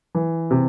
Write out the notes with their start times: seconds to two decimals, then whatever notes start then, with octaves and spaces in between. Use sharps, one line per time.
0.15 E3
0.51 C3